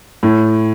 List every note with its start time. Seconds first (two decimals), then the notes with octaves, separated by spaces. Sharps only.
0.23 A2